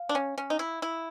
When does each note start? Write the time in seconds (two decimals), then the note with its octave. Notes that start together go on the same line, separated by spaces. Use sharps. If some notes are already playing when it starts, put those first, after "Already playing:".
Already playing: F5
0.09 D4
0.15 C#4
0.38 C#4
0.50 D#4
0.59 E4
0.82 E4